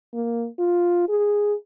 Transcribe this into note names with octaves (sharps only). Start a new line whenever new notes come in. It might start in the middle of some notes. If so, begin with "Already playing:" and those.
A#3
F4
G#4